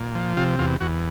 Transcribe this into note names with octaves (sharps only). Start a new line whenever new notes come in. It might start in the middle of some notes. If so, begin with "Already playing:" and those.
Already playing: A#2
F3
C3 F4
E2 F4
E2 F#4